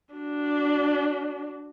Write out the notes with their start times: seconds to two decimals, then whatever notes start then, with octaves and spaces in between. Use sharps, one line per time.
0.14 D4 F#4